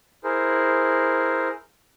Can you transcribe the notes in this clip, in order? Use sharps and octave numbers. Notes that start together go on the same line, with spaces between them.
E4 G#4 A#4 C5